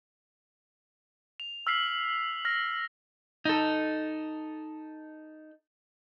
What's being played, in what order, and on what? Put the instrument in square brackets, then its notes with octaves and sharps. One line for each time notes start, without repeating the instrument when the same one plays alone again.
[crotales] F7
E6 F6 B6 C7 F#7
F6 A#6
[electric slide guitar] D#4 A4